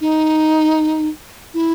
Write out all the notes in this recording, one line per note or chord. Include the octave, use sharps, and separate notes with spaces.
D#4
E4